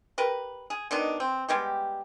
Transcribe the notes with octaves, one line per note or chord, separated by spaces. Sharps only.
G4 A#4 B4
G#4
B2 D#3 D4 D#4
C4
G3 G#3 B3 G4